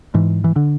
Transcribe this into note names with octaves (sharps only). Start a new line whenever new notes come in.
G#2 E3
E3
D3